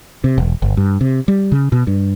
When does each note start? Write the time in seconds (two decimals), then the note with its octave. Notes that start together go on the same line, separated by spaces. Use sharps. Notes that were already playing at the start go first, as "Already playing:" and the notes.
0.24 C3
0.38 E1
0.62 G1
0.77 G2
1.01 C3
1.28 G3
1.52 C#3
1.72 B2
1.87 G2